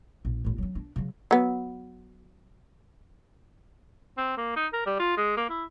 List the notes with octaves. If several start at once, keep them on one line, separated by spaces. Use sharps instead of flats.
A#1
A1 A2
F#3 C#4
D4
C#3 F#3
F#3 B3
C4
A#3
D#4
A#4
G3
F4
G#3
A#3
E4